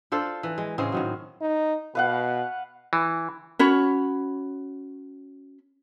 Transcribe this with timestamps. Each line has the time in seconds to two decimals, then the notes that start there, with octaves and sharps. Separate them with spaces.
0.12 D4 F4 A4 C5
0.43 E3
0.58 G#3
0.78 A2 C#3 G#3 C4
0.92 A2 D#3 F#3
1.41 D#4
1.95 B2 B4 F5 F#5
2.93 E3
3.59 C#4 F#4 C#5 B5